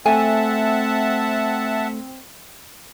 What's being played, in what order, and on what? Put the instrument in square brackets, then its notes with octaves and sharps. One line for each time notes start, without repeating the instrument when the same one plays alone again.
[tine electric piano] A3 [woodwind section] C4 [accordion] E5 F#5 A5 [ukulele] G#5